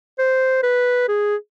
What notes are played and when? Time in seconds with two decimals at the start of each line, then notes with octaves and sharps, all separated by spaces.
0.18 C5
0.63 B4
1.08 G#4